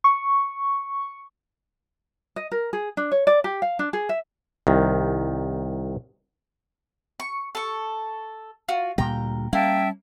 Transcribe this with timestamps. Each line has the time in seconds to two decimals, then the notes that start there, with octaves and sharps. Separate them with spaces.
0.04 C#6
2.36 D#5
2.51 A#4
2.73 G#4
2.97 D4
3.12 C#5
3.27 D5
3.44 G4
3.62 F5
3.79 D4
3.93 G#4
4.09 E5
4.67 C2 D#3
7.20 C#6
7.55 A4 C#6
8.68 F4 F#4
8.98 D2 A#2 G3 G5 A#5
9.53 G3 A#3 C#4 E5 G5 A5